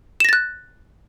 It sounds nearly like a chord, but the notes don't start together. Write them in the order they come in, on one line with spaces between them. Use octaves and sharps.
E7 A#6 A6 F#6